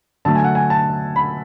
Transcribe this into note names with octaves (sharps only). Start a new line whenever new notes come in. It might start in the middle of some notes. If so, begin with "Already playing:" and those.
D3 F#3 A3 A5
G#5
F#5
G#5
A5
B5